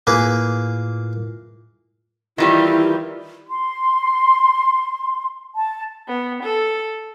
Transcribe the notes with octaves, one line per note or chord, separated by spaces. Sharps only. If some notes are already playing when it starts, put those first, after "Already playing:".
A2 A#3 E4 F4 G#4 B4
D#3 E3 G3 E4 F4 G4
C6
A5
B3
A4